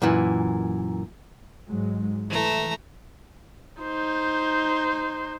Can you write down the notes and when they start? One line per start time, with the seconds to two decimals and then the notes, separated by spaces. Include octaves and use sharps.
0.02 F#2 A#2 E3
1.68 G#2 F#3 G#3
2.30 E3 A3 A#5
3.81 D#4 C5